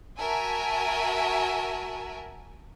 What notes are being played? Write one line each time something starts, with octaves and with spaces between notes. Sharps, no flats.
F#4 A#4 E5 G#5 A5